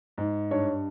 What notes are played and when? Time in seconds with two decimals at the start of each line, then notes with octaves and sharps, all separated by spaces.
0.18 G#2
0.51 G2 C#5